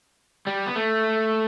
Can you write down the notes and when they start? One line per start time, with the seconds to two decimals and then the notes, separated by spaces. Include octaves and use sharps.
0.47 G3
0.67 B3
0.76 A3